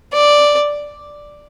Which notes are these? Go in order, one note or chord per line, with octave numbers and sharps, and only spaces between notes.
D5